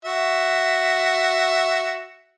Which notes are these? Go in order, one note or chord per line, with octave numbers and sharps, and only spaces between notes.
F#4 E5